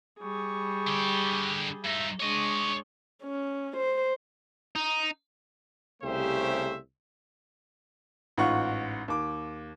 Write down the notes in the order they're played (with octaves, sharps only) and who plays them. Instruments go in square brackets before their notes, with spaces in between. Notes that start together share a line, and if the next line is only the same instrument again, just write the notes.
[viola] G3 G#4 [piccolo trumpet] C#6
[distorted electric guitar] D3 G4
[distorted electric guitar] G2 D#4 [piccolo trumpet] E5
[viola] G#3 D4 [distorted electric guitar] C#5 D#5 [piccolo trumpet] C#6
[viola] C#4
C5
[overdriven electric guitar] D#4
[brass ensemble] C2 C#3 A3 G4 C5 E5
[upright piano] A1 G#2 F4 F#5 C#6
D#2 D6